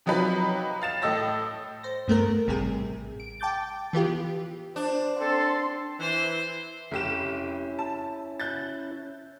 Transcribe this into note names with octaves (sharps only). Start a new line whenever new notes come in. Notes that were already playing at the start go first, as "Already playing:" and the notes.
C3 F3 F#3 D#4 B4
F5 A6 E7
A2 A4 D#5 E6 A6 A#6
C5 A#6
G2 A3 B3 A#4
A1 C3 G3 G#4
D7
G5 A5 D6 G6 A6
E3 B3 F4 G4
D4 C5
C4 A4 C6
E3 C5 C6
F1 C#4 E4 G4 E7
A5
F#6 G6 A6